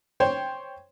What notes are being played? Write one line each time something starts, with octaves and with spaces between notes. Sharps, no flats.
C5 C#5 G5